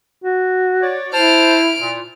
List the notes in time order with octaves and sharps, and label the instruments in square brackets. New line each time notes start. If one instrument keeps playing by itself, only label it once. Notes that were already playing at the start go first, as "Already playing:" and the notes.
[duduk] F#4
[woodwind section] C#5 D5
[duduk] E4 [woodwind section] C5 A5 [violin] F6 D7
[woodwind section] A#2